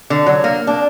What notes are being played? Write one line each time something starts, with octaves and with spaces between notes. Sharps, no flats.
D3
F#3
A#3
D4